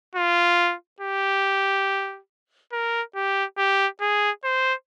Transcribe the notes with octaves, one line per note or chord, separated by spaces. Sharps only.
F4
G4
A#4
G4
G4
G#4
C5